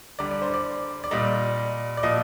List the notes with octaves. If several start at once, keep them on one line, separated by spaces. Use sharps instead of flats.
D3 G3 D5
D5
C5
D5
D5
A#2 G3 D#5
D5
A#2 F3 D#5